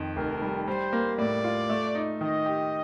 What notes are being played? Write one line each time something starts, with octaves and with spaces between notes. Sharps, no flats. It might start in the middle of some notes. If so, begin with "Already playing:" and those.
Already playing: F2 D#3
F1 A#4
G3
G3 C5
A#3
A2 D5
F4
A3
D#4
D#3 D#5
G4